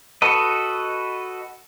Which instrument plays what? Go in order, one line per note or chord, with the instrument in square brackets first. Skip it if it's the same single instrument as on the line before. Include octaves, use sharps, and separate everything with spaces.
[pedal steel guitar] F#4 A4 B4 D#5